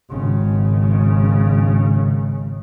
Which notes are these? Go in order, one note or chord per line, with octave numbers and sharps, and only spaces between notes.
G#1 C#3